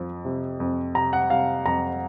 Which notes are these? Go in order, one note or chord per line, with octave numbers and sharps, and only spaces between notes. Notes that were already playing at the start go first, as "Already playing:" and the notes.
Already playing: F2 F3
C3
F2
C3 A#5
F#5
C3 F5
F2 A#5